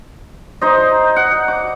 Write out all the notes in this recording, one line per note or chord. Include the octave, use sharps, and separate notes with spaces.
D#4 C5 D#5
F#5
D6